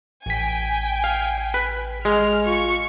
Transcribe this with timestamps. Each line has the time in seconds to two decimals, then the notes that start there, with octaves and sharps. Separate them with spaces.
0.26 A1 G5 G#5 B6
1.04 F5
1.54 B4
2.05 G#3 F6
2.47 F4 C#6